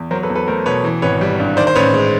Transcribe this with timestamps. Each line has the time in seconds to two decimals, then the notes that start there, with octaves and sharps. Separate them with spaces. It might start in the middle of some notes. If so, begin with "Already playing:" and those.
Already playing: E2
0.11 F#3 A#4 C5
0.23 A4 B4
0.30 E2
0.35 A4 B4
0.48 A3 A#4 C5
0.66 B2 B4 C#5
0.84 E3
1.02 G#1 B4 C#5
1.21 G3
1.40 G2
1.57 D#3 C5 D5
1.67 C5
1.75 A1 B4 C#5
1.94 G#3